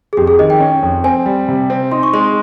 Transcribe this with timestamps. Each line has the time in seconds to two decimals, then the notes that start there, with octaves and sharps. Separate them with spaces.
0.13 G#4
0.17 F2 G4
0.27 G#4
0.39 D#3 D#5
0.50 G5
0.60 C#4
0.83 F2
1.04 C4 G#5
1.26 G3
1.48 C3
1.70 C4
1.91 D#4 C6
2.03 C#6
2.13 G#3 C6